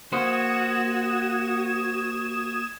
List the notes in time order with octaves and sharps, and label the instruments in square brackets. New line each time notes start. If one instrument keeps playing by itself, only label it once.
[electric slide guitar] A#3 C5 [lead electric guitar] F#4 [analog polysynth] D#6 G#6 E7